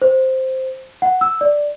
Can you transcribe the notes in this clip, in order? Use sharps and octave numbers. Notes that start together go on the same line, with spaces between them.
C5
F#5
E6
D5